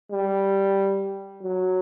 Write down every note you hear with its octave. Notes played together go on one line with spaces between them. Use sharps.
G3
F#3